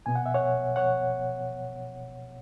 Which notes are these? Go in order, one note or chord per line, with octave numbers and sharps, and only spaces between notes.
B2 B3 G#5
F#5
E5
C#5 F#5
C#5 F#5